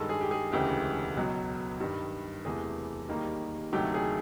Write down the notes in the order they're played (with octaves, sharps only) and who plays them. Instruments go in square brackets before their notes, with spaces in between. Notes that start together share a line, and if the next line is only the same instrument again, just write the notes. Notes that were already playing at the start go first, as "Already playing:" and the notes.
Already playing: [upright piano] G2 D#3 G#3 A4
G#4
G4
G#4
E1 D2 C#3 E3 G#3 G4
C#2 B2 F#3
G2 D#3 G3
E1 E2 C3 E3 A3 G#4
D#2 D#3 G3 A#3 D#4
D2 C3 D#3 F#3 A3 G4
G#4